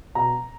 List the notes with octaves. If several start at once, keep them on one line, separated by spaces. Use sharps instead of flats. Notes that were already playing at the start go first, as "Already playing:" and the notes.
B2 A#5